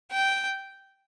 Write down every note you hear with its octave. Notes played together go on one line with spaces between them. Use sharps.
G5